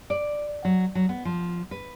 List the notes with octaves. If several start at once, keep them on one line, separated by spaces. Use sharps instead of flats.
D5
F#3
F#3
B3
F3
B4